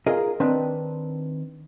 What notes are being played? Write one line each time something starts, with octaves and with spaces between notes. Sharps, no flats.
F4 G#4 A#4 D#5
D#3 C4 D4 B4